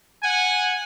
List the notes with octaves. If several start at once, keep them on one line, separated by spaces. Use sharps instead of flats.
F#5 G#5